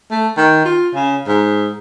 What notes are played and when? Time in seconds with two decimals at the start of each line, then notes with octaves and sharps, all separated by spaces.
0.11 A3
0.37 D#3
0.65 F4
0.94 C#3
1.28 G#2